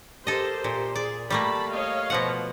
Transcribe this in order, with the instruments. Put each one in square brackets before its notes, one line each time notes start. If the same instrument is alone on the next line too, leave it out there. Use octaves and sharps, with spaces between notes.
[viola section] G4 A#4 C5 [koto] A4 D#5
[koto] A#2
[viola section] G#4 [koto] D5
[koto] G3 A3 A#3 [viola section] A5 B5
[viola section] C#5 D#5 F5
[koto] B2 F3 F#5